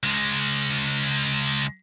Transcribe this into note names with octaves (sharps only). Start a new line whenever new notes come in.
C#2 G#3